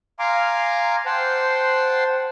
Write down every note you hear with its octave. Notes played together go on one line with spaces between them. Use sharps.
F5 G#5 A#5 C6 D6
C5 F#5 G5 A5 C6